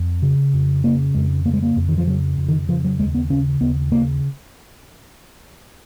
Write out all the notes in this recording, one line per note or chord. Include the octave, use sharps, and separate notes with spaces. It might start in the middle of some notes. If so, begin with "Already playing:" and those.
Already playing: F2
C#3
F2
C#3 A#3
F2 G#3
C#3 A#3
G#3
A#3
F2
D#3
F3
C#3 F#3
F2
D#3
C#3 F3
F#3
D#2 G#3
B3
C#3 C#4
D#2 B3
C#3 A#3